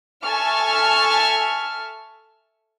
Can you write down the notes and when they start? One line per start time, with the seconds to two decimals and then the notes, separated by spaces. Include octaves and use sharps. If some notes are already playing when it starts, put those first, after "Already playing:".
0.25 A4 E5 G#5 A5 C#6 F6